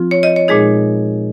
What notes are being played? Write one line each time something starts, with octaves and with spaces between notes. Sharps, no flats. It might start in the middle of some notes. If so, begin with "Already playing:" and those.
Already playing: F3 C4 F4
C#5
D#5
C#5
A#2 G#3 D#4 G#4